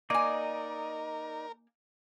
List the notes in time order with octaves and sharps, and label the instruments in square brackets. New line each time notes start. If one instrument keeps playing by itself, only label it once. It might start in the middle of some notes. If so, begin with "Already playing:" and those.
[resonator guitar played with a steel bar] A#3 G#5 [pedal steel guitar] D#4 D5 D#5 [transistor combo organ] A#4